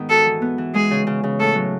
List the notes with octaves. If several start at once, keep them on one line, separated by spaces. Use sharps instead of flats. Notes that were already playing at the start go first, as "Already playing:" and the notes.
Already playing: G#2 D#3 B3 D#4
F#4 A4
E3
B3
E3
G#3 G#4
C#3
C#3
C#3
A2 A4
F#3